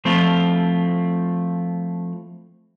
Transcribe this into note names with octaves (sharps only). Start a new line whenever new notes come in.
F3 A3 C4 E4 F4